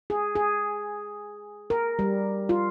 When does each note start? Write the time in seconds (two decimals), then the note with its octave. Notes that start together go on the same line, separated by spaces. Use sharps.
0.10 G#4
0.35 G#4
1.70 A#4
1.99 G3
2.49 F4